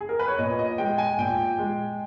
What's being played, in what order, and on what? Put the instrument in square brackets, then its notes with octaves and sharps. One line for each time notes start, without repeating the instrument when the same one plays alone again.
[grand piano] G#4
A#4
B4
C#5
A#2 D#5
D#5
G#3 G5
G#5
A#2 G5
G#3